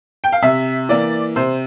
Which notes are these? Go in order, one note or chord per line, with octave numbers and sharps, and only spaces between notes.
G5
F5
C3 E5
E3 A#3 D5
C3 C5